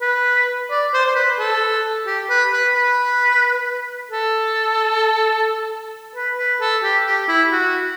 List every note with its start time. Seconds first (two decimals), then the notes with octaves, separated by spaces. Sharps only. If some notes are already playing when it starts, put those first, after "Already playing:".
0.02 B4
0.71 D5
0.94 C5
1.06 C5
1.15 B4
1.39 A4
2.06 G4
2.30 B4
2.52 B4
2.75 B4
4.11 A4
6.15 B4
6.38 B4
6.61 A4
6.83 G4
7.06 G4
7.28 E4
7.52 F#4